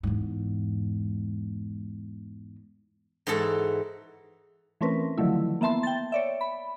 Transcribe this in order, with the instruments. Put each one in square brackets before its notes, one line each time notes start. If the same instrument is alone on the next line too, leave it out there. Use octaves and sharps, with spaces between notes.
[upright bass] E2 G#2
[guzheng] G#2 E3 F#4 A4 A5
[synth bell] E3 A3 C4 C#4 A#4 B4
D3 D#3 F3 F#3 A3 E4
A#3 B3 E5 A5 C6
G5 A6
C#5 D5 E5
B5